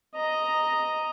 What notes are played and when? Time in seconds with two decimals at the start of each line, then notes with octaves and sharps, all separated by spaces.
0.15 D#5 A#5